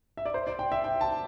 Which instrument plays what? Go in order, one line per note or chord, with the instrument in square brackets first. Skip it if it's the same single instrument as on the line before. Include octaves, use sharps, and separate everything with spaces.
[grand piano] E5
D5
C5
D5
G5
E5
G5
A5